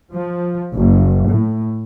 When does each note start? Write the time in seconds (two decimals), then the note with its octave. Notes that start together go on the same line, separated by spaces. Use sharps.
0.12 F3
0.75 F#1
1.29 A2